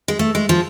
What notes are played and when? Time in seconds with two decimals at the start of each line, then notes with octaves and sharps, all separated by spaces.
0.08 G#3
0.19 A3
0.35 G#3
0.49 F3